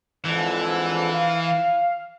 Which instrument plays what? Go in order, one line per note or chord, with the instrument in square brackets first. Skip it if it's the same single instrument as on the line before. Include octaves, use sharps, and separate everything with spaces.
[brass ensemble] F2 G#2 D3 [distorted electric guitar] E3
[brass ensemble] F5